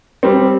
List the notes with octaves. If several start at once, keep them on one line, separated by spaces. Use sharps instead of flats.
G3 C4